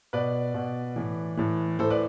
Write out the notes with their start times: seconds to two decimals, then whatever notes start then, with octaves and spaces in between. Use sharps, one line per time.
0.13 B2 B4 D5
0.54 B2
0.96 A2 E3
1.37 A2 E3
1.79 A2 E3 A4 C5
1.90 B4 D5